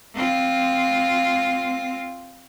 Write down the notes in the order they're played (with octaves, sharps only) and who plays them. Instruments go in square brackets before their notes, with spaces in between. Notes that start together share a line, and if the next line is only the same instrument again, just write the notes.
[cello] C4 F4